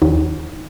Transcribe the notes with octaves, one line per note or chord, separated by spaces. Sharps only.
D#2